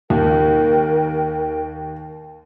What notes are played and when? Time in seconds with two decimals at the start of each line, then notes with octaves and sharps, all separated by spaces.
0.10 D#2 A#4 G5